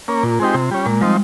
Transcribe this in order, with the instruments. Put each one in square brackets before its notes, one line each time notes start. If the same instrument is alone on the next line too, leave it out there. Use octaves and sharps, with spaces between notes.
[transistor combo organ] A#3 C#4
[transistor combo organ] A#2 [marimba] F4
[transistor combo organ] G#3 C4 D#4 G4
C3
G3 C#4
[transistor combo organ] A#2 [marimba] G#3
[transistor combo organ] F3 C4 D#4 [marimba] G3